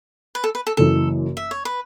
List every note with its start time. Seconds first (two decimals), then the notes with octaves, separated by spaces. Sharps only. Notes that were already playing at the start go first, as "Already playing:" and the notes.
0.35 B4
0.44 A4
0.55 B4
0.67 A4
0.77 F#1 F#2 E3 A4
1.37 E5
1.51 C#5
1.65 B4